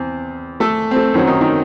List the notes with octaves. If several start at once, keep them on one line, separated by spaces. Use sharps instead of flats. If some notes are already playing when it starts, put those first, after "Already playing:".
Already playing: E2 C4
A3 A4
C4
A3
F#2 D#3 F#3 C4
D#3 D#4
D#3 D#4